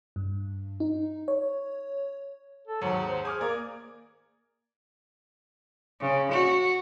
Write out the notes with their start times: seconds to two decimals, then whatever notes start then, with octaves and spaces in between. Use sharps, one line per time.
0.16 G2
0.80 D#4
1.28 C#5
2.67 A4
2.81 D#2 G#2 F#3
3.08 C5
3.25 G#4 G#5 D6 F6
3.41 A#3 A#4 D5 G#6
6.01 C#3
6.32 F#4